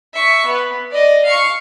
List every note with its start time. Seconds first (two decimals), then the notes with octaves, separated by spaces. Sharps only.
0.14 E5 C#6
0.46 B3
0.91 D5 D#5
1.25 F5 C#6